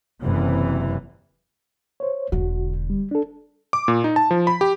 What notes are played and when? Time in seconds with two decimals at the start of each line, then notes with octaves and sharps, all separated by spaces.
0.23 F#1 F#2 C3 E3
2.00 C5 C#5
2.32 E1 D3 F#4
2.90 G3
3.11 D4 A4
3.73 D6
3.88 A#2
4.04 D#4
4.16 A5
4.31 F3
4.47 B5
4.61 G4